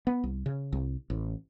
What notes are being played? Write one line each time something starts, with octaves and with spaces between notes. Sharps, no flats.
B3
C2
C#3
C2
A1